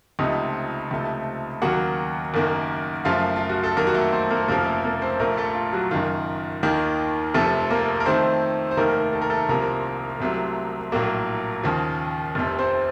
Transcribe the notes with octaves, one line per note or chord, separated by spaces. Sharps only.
C#2 C3 F3 A3 D#4 D#5
C#2 C3 F3 A3
D#2 C#3 F#3 A#3 F#4 F#5
F#1 F#2 D#3 A#3
F#1 F#2 F3 A3 F4 F5
F4
F#4
A4
F2 D#3 F#3 A#3 A#4
F#4
A3 A4
C4 C5
A#3 A#4
F1 F2 C#3 F3 A#3 A#4
A3 A4
A#3 A#4
C4 C5
A#1 A#2 A3 A#3 A#4
A3 A4
F4
F#3 F#4
F#1 F#2 D#3 F4
D#2 D#3 A#3
F1 F2 C3 F3 A3 A4
A#3 A#4
A#4
F2 D#3 A3 C4 C5
C5
F1 D#2 D#3 A3 A#3 A#4
A4
A#4
A3 A4
C2 C3 F3 A#3 A#4
C2 C3 F#3 A3
A#1 A2 F#3 A#3
D#2 C#3 F3
F1 F2 C3
C4 C5